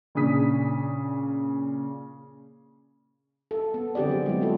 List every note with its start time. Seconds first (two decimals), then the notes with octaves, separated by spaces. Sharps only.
0.15 A#2 C#3 D4 D#6 B6
3.51 A4
3.74 B3
3.95 D3 C4 G4 G#4 D5
4.09 F#3 B3
4.26 G#3 E4
4.41 F4 F#4 A4